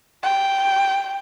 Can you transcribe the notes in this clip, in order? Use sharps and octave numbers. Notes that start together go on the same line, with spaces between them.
G5